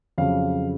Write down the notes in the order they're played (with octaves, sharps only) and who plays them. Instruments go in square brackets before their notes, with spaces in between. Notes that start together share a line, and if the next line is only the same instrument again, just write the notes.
[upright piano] F2 C#3 F#3 F5